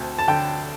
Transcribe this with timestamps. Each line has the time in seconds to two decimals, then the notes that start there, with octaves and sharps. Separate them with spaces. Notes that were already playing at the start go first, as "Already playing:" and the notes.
Already playing: D2 C4 A5
0.19 A5
0.28 D3 G5